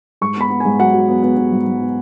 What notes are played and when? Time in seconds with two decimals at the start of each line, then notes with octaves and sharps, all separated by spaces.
0.21 G#2 C#6
0.37 B3 B5
0.50 B3
0.60 G#5
0.65 G#2
0.80 F#3 F#5
0.94 F#3
1.08 B3
1.23 B3
1.37 B3
1.53 G#2
1.67 G#2
1.81 B3